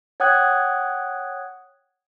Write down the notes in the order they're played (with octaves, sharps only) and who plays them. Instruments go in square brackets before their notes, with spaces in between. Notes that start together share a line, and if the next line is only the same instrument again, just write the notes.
[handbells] C#5 F#5 G5 D#6 F#6 G#6